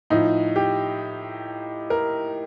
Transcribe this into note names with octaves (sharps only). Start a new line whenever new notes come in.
A2 F3 D#4
G4
A#4